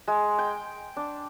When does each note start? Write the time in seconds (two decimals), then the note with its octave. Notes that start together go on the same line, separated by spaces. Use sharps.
0.08 G#3
0.38 G5
0.97 D4